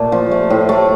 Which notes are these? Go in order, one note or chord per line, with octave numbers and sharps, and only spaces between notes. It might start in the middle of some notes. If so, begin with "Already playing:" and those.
Already playing: A#2 A3
F3
A3
A2
A3